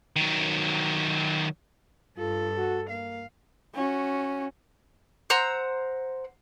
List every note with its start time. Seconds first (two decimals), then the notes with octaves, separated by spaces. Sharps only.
0.16 D#3 F#3
2.17 G2 F4 A4
2.57 F#4
2.90 A#3 F5
3.75 C#4 F#4
5.30 C5 F#5 A#5 E6